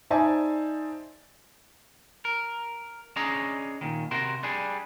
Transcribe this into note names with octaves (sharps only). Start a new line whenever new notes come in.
D#4 C5 D5 E5 G#5 A5
A#4
C#4 D4 G#4 D#5 A#5
A#2 D#3
C3 F#4 A#4 C5
G3 D4 G#4